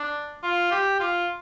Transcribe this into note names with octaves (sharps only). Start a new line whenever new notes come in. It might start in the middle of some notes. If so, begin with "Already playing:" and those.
Already playing: D4
F4
G4
F4